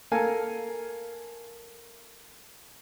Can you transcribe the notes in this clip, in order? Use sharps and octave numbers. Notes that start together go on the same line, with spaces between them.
A#3 A4 A#4 F5 G#5